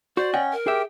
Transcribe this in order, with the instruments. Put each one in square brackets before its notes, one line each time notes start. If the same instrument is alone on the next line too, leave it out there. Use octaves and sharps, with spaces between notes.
[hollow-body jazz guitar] F#4 [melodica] C5 [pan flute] D5
[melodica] C#4 [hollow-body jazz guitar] D#5 F#5 G5
[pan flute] A#4
[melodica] G4 G5 [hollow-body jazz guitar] G#4 E5